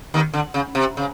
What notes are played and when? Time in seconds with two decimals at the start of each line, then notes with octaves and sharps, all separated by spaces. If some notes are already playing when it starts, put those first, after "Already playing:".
0.14 D#2 D#3
0.33 D3
0.54 C#3
0.75 C3
0.97 C#3